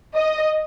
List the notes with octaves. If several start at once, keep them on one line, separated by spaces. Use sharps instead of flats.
D#5